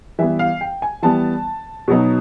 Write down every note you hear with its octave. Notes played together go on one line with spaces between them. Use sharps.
E3 G3 B3 E5
F5
G5
G#5
E3 G3 B3 A5
B2 F#3 B3 D#4